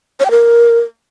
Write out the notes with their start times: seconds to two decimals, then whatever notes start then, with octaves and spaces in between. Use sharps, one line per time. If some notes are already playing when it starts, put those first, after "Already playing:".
0.20 C#5
0.25 G5
0.31 A#4